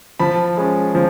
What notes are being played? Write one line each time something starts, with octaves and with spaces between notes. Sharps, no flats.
F3 A5 B5
G#3 C#4
F3